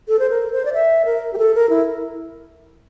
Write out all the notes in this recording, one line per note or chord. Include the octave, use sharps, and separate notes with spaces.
A4
C5
A#4
C5
D5
E5
A#4
G4
A4
A#4
E4